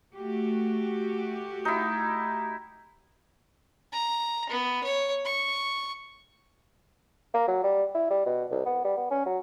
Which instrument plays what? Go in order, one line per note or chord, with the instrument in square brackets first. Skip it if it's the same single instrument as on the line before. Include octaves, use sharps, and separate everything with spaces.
[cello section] A3 F#4 G4
[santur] D#4 E4
[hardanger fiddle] A#5
B3
C#5
C#6
[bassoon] A#3
F#3
G3
E4
G3
B2
C2
B3
G3
B3
C#4
F#3